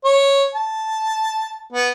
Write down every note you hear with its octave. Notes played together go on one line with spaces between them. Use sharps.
C#5
A5
B3